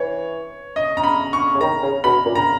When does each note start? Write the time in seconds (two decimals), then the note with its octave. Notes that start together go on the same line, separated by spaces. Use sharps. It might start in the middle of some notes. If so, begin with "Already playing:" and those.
Already playing: E3 C#5
0.76 D#5
0.97 A#5
1.04 B5
1.33 C#6
1.55 C#3
1.61 D#3 A#5
1.83 C#3
2.04 B2 B5
2.26 A#2
2.35 A#5